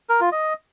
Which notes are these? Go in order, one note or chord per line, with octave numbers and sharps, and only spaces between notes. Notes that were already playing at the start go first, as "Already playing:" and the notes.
A#4
F4
D#5